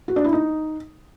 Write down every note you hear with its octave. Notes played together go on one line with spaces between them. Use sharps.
F#4
D4
E4
D#4